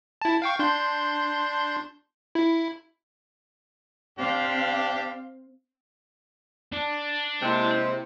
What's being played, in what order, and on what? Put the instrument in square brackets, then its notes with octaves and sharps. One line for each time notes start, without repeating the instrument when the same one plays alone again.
[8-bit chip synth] E4 A5
F5 G5 C#6
D4 C6 G6
E4
[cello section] C4 F5 [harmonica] D4 G4
[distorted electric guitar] D4
[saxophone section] C3 [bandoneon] G#3 C5 [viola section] A#3 E4